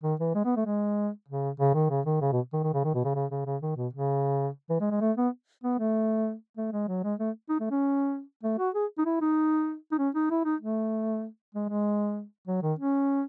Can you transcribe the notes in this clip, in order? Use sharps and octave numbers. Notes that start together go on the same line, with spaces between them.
D#3
E3
G#3
B3
A3
G#3
C#3
C#3
D#3
C#3
D#3
C#3
B2
D#3
D#3
C#3
D#3
B2
C#3
C#3
C#3
C#3
D#3
B2
C#3
E3
G#3
G#3
A3
B3
B3
A3
A3
G#3
F#3
G#3
A3
D#4
A3
C#4
A3
F#4
G#4
D#4
E4
D#4
D#4
C#4
D#4
E4
D#4
A3
G#3
G#3
F#3
D#3
C#4